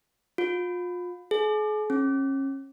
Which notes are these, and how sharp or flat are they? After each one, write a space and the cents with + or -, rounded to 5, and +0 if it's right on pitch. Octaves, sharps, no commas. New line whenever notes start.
F4 +30
G#4 +40
C#4 -30